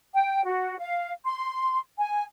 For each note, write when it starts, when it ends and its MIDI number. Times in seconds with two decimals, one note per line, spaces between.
0.13 0.43 79
0.44 0.76 66
0.79 1.11 77
1.25 1.79 84
1.98 2.23 80